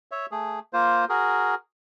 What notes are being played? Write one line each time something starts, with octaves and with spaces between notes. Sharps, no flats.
C#5 E5
A3 G#4
A#3 F4 C5
F#4 G#4 A#4